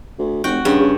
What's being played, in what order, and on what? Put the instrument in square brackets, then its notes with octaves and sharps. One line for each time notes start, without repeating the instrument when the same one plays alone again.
[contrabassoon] D2
[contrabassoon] F1 [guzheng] F#4 G5
[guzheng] G2 [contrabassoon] C#3
[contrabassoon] C#3